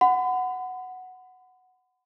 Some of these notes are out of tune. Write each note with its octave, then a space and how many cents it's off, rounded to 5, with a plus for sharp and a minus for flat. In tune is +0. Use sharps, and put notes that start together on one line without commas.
F#5 +0 B5 +40